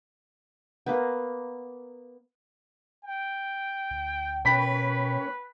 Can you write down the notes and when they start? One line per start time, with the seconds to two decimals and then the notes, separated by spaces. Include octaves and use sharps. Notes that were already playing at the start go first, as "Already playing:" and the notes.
0.86 A#3 B3
3.04 G5
3.91 D2
4.45 B2 A#3 C#4 B4 C#5 G5 B5 B6